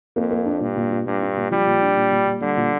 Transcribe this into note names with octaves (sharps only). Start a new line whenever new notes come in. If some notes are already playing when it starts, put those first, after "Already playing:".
F2 A#3
A#3
D4
G2 A#2
A#2
A#2
G2 A#2
D4
A#2
F3 G3
A#2
D4
A#2
A#2
A#2
D3 G3
A#2